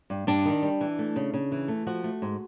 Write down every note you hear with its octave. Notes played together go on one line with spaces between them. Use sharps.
G2
G2 D4
D#3
G3
E3
A3
C#3
C#3
E3
A3
F3 F#4
A3
G#2